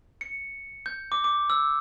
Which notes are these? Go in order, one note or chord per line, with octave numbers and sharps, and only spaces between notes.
C#7
G6
D6
D6
E6